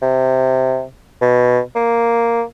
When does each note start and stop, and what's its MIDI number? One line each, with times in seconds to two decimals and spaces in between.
0.02 0.83 48
1.21 1.60 47
1.76 2.43 58